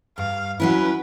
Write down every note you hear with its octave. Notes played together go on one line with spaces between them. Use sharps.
G2 F5
F#3 C#4 E4 B4